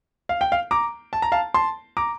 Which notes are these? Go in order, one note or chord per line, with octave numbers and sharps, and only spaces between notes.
F5
G5
F5
A#5 D6
A5
A#5
F5 A5
A5 C6
A#5 D6